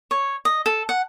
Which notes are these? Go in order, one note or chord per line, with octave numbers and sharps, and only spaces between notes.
C#5
D#5
A4
F#5